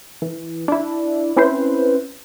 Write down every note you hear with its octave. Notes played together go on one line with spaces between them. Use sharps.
E3
D4 E4
C4 C#4 E4 B4 C5